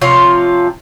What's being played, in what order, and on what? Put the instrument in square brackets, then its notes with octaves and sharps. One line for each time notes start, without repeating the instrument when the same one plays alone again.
[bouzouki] C3 F3 F4 C#5